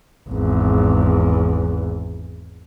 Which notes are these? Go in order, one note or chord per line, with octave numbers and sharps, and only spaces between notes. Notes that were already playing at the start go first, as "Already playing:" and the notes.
G#1 E2